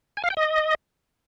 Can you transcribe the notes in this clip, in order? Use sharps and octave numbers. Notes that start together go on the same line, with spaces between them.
G#5
F5
G5
D#5